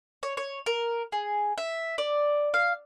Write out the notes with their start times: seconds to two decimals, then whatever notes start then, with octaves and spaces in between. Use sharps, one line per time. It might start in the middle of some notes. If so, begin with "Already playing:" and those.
0.23 C#5
0.37 C#5
0.66 A#4
1.12 G#4
1.58 E5
1.98 D5
2.54 F5